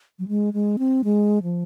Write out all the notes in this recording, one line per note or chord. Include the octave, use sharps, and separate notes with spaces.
F#3
G#3
G#3
C4
G#3
F3